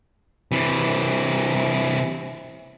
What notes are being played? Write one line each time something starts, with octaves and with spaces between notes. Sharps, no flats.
C3 E3